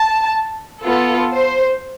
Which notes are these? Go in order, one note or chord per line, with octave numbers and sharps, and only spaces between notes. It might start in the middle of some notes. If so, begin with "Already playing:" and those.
Already playing: A5
B3 F4 A4
C5